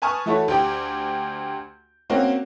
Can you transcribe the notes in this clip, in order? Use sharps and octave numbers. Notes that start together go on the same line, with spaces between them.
B4 G#5 A5 C#6 D#6 F6
E3 A3 E4 F#4 A4 C#5
D2 G4 G5 D6
A#3 C4 C#4 F#4 A#4